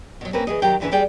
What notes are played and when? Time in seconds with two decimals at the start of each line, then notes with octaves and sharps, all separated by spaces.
0.21 B2 F#3
0.33 A#3 C4 C#4 B4
0.47 E3 G#4 D#5
0.62 D#3 F#3 G4 G5
0.80 D2 G#2 E3 C#4 B4 E5
0.91 G3 G#4 D5 G5